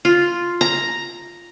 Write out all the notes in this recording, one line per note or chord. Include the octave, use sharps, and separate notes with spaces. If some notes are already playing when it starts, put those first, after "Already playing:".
F4
A#5